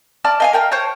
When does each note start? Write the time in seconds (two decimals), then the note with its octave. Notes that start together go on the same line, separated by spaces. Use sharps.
0.24 D5 A5 D6 F6
0.40 D#5 F5 G#5
0.53 A#4 G5 A5
0.72 C5 C#5 G5 A5